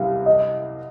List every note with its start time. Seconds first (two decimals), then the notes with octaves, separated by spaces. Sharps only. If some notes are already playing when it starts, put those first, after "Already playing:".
Already playing: C2 C3 G3 G4 F5
0.26 D#5